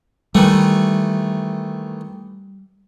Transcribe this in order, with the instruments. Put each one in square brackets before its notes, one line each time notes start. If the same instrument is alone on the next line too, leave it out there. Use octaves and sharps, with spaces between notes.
[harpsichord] D#3 E3 A3 [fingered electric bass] G3